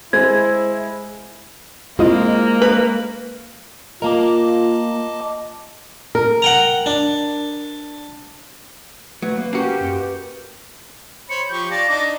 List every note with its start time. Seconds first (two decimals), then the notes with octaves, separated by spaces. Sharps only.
0.13 G#3 E4 C5 G#6
1.99 G#3 A#3 C4 E4 F4 D#5
2.62 B4
4.02 A#3 F4 A#4 D#5 A5 D6
6.15 A#4
6.42 F#5 G5 A#5
6.86 D4
9.22 F#3 A3 B4
9.38 A#3
9.53 A#3 C#4 F#4 G4
9.81 F#2
11.30 C5 C#5 B5 C#7
11.50 F3 G4 C#6 G6
11.71 F4 D5 A5 A#6
11.88 D4 D#4 D6